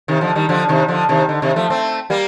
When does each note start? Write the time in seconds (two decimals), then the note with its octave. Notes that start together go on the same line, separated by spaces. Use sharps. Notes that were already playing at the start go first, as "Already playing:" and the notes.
0.08 C3 D#3
0.21 D3 F3
0.35 D#3 G3
0.49 D3 F3
0.69 C3 D#3
0.88 D3 F3
1.09 C3 D#3
1.29 D3
1.42 C3 D#3
1.56 F3 A3
1.70 A3 C4
2.10 G3 A#3